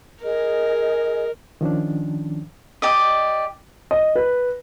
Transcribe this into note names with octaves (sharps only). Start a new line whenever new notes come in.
G#4 A#4 D#5
D#3 F3 C#4 D4
G4 D5 D#5
D#5
B4